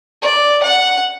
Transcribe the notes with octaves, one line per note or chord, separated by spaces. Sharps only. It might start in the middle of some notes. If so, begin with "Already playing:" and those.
D5
F#5